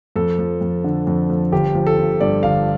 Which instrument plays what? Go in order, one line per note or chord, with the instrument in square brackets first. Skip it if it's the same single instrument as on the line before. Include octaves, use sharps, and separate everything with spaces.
[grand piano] F2 A4
F3
F2
D3
F2
F3
G1 G4
F3
A4
G1
G2 D5
G1 F5